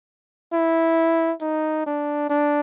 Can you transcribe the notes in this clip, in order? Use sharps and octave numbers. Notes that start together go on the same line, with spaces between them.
E4
D#4
D4
D4